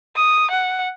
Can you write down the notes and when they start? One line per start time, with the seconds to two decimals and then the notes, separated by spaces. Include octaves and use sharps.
0.16 D#6
0.51 F#5